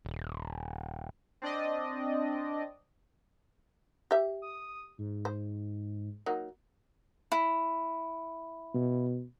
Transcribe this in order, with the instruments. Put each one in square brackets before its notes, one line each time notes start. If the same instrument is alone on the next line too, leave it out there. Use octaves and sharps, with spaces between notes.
[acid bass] D#1
[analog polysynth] C4 D4 D5 D#5
[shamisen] G4 E5
[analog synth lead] D#6
G#2
[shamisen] C5
F#3 A#3 D#4
[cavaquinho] E4
[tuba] B2